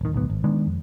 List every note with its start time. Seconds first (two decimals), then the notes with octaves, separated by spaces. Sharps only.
0.01 D1 D#3
0.13 D1 B1 G#2 B3
0.30 G#1
0.44 D#3 G#3 B3 D4
0.67 F2